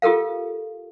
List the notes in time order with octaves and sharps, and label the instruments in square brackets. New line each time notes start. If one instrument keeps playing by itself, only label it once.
[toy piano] F4 G4 A4 A#4 F5